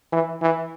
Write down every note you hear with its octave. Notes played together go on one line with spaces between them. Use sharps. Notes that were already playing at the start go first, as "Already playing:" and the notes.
E3
E3